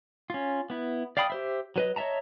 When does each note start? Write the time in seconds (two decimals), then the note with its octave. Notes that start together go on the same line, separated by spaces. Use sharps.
0.30 C#4 F4
0.70 B3 E4
1.17 D5 F5 G5 B5 D#6
1.30 G4 C5 E5
1.76 F#3 B4 D#5
1.96 C#5 D#5 E5 A5 A#5